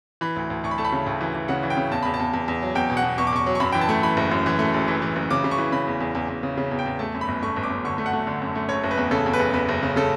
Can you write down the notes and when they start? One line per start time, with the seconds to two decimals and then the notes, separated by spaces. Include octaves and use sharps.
0.21 E3 B5
0.36 D2
0.50 D2
0.64 D2 C#6
0.71 B5
0.78 A3 A5
0.85 B5
0.92 C#3
1.06 D2
1.21 E3
1.35 E3
1.48 C#3 F#5
1.63 E3
1.70 G5
1.77 C#3
1.92 E2 A5
2.03 E2 B5
2.14 A5
2.20 E2
2.34 E2
2.48 E2
2.62 F#3
2.75 E2 G5
2.89 B2
2.97 F#5
3.04 B2
3.18 E2 C#6
3.27 D6
3.33 E2 C#6
3.46 F#3
3.55 C#6
3.60 F#2 B5
3.72 E3 G5
3.81 A5
3.89 A3
4.03 E3 B5
4.17 F#1
4.31 F#2
4.46 E3
4.59 A3
4.74 F#1
4.88 E3
5.02 E3
5.16 F#1
5.30 C#3 D6
5.44 C#3
5.51 C#6
5.58 E3
5.72 C#3 B5
5.87 E2
6.00 E2
6.15 E2
6.29 E2
6.43 C#3
6.58 C#3
6.71 E2
6.79 G5
6.86 E2
6.99 A3 A5
7.14 F#2
7.21 B5
7.28 G1
7.42 A3 C#6
7.56 G1
7.63 D6
7.70 F#2
7.84 D3 C#6
7.98 A3
8.06 F#5
8.13 A3
8.27 D3
8.42 F#2
8.55 A3
8.69 F#1 C#5
8.84 F#1
8.91 B4
8.97 E2
9.11 C#3 A4
9.26 E2
9.33 B4
9.39 F#1
9.54 E2 B4
9.69 F#1
9.83 C#3
9.96 C#3 A4